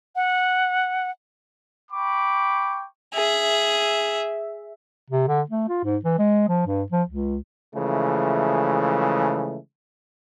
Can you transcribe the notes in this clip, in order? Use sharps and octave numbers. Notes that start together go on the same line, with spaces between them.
F#5
G5 B5 C#6 D6
G#4 E5
C3
D3
A3
F4
G#2
E3
G#3
F3
G2
F3
C#2
C#3 E3 F3 G#3 A3